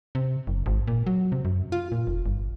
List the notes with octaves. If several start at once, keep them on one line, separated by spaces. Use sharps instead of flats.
C3
F#1
G#1
A#2
F#3
C3
F#2
F4
A#2
F1
G1